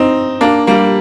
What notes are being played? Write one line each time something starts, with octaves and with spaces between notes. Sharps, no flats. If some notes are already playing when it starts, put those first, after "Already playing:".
Already playing: C4 D#4
A#3 D4
G3 A#3